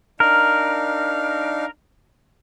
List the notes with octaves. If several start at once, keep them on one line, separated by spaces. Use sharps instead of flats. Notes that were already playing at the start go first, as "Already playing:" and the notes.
D4 D#4 A#4 F5